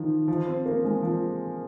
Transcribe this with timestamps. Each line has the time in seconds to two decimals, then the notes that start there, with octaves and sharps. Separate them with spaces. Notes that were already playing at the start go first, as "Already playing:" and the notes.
Already playing: D#3 F3
0.28 F3
0.47 C4
0.66 A#3
0.84 G#3
1.03 F3